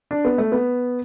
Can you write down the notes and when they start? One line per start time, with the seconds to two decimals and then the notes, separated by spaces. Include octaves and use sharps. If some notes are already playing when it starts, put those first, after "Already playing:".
0.11 D4
0.25 B3
0.38 A3
0.52 B3